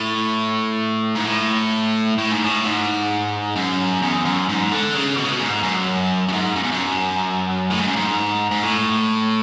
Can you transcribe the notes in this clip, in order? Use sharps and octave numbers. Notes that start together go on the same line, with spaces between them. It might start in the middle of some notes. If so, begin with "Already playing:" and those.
Already playing: A2
G#2
A2
A2
G#2
A2
G#2
F#2
E2
F#2
G#2
D3
C#3
B2
C#3
B2
G#2
F#2
F#2
G#2
F#2
E2
F#2
A2
G#2
F#2
G#2
G#2
A2